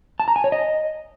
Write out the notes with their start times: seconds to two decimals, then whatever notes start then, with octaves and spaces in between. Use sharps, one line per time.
0.20 A5
0.28 A#5
0.36 G#5
0.44 C#5
0.52 D#5